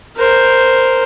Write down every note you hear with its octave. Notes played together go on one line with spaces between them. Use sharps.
A#4 C5